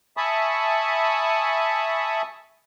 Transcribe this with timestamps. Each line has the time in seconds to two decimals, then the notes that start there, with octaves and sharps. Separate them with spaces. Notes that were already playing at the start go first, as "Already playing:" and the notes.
0.17 E5 G#5 A5 B5 C#6 D#6